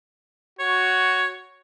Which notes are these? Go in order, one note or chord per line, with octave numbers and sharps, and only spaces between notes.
F#4 C#5